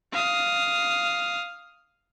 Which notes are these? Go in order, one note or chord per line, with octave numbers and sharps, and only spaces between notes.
F5 D#6